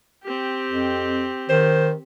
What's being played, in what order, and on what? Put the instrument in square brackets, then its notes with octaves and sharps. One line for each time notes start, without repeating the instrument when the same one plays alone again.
[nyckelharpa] C4 G4
[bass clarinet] F2
[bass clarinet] D#3 [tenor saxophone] C5